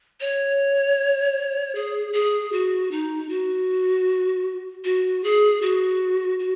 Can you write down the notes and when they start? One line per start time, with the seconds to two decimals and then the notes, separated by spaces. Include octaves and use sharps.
0.20 C#5
1.75 G#4
2.13 G#4
2.52 F#4
2.91 D#4
3.29 F#4
4.85 F#4
5.24 G#4
5.62 F#4
6.39 F#4